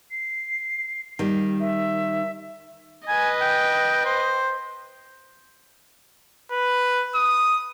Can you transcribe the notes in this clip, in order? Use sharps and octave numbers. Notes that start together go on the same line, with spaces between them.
C7
D#3 G3
E5
B4 D#5 G#5
G5
C5
B4
D#6